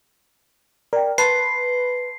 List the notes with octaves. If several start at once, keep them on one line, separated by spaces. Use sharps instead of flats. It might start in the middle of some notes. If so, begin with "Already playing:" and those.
A#4 D5 G5
B4 A5 C6 A6 C7